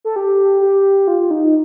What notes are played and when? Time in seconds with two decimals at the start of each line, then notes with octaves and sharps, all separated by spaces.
0.05 A4
0.16 G4
0.61 G4
1.08 F4
1.31 D#4